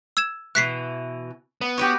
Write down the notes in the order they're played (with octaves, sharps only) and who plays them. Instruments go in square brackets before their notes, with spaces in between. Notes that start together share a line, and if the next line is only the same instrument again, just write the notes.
[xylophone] E6 G#6 E7
[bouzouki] B2 E3 [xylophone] F#6 B6 C7
[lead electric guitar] B3
[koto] F#4 G4 [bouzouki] B4 C#5